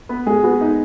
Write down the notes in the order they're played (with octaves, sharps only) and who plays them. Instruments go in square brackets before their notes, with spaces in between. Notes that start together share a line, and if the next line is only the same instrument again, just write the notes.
[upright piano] B3 B4
G#3 G#4
B3 F#4
D#4